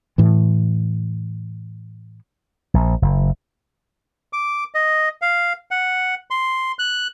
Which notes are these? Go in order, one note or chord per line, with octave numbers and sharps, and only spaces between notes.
A2 E3
A#1
F#1
D6
D#5
F5
F#5
C6
F#6